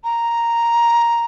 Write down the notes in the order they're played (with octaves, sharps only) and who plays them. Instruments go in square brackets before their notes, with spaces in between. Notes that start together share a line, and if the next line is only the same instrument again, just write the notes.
[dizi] A#5